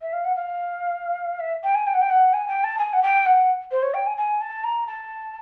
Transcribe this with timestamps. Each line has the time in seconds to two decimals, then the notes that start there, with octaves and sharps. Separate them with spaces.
0.02 E5
0.13 F5
0.24 F#5
0.36 F5
1.40 E5
1.64 G5
1.75 G#5
1.87 G5
1.94 F#5
2.01 G5
2.10 F#5
2.33 G#5
2.48 G5
2.64 A5
2.79 G#5
2.93 F#5
3.03 G5
3.26 F#5
3.71 C5
3.83 C#5
3.94 G5
4.06 G#5
4.17 G#5
4.41 A5
4.64 A#5
4.87 A5